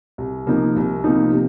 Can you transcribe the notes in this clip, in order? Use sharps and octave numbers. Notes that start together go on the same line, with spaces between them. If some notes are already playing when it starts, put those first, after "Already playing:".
C2
C3 F3 A#3 D#4
C2
C3 F3 A#3 D#4
C3